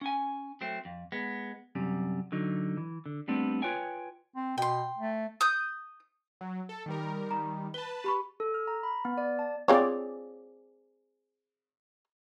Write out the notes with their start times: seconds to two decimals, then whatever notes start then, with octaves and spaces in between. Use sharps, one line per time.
0.01 C#4 G#5
0.61 F#3 A3 C4
0.85 F2
1.12 G#3 B3
1.75 F#2 C3 G3
2.32 D3 F#3 D#4
2.77 E3
3.06 D3
3.28 G3 A3 B3 C4 D4
3.62 F4 B4 C#5 G5 G#5
4.35 C4
4.58 B2 G5 C6
4.97 A3
5.41 D#6 G6
6.41 F#3
6.69 A4
6.86 D#3 G3 A#4
7.31 D#3 G3 A#5
7.74 B4 A5 G7
8.04 G4 B5 C#6
8.40 A4
8.54 F6
8.67 A#5
8.83 B5
9.05 B3
9.18 D5
9.39 A5
9.68 C4 F4 G#4 C#5 D5